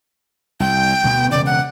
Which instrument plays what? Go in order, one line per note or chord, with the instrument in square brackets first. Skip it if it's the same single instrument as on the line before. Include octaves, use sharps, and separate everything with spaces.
[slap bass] C2 [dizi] G5
[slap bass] D2 B2 B3
[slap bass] E1 C#3 [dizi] D5
[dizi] F#5